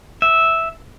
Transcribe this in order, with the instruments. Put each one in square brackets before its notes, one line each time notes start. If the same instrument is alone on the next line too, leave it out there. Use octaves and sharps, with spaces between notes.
[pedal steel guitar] E5